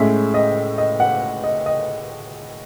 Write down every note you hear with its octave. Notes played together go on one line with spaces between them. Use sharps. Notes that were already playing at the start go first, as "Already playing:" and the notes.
Already playing: A2 G#3 C#4 E5
D#5
D#5
F#5
D#5
D#5